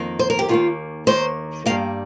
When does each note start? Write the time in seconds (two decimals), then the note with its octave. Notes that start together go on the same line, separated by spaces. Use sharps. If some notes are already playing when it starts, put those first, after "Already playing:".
Already playing: F2 D#3 A#3
0.19 C5
0.30 A#4
0.39 G4
0.49 D#2 D#3 A#3 F4
1.07 D#2 D#3 A#3 C5
1.66 G2 G3 A#3 F5